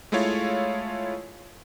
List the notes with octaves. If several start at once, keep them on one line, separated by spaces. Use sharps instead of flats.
G#3 A3 E4 F4 C#5 F5